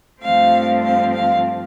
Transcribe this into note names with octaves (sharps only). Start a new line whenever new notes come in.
G2 F3 A3 C4 F5
F5
F5